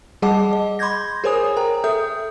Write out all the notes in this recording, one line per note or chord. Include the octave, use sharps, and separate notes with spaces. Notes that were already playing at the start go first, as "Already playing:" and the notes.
G3 G#4 D#5 F#5 A5 D6
D#5
B5 C6 D6 G6 G#6 A#6
G#4 A#4 C5 C#5 G#5 D#6
A#4 G5 A#5
A4 E5 D#6 G6